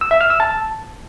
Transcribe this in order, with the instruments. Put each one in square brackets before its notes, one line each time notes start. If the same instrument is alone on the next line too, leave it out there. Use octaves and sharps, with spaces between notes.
[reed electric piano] E6
E5
F6
E6
A5